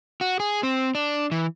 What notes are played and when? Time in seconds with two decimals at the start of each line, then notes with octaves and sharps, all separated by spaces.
0.21 F#4
0.40 G#4
0.63 C4
0.95 D4
1.31 E3